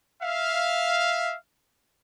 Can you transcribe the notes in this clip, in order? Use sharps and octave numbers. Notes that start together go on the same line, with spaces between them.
E5 F5